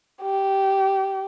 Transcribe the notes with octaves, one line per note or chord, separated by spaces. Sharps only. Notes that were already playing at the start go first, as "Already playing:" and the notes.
G4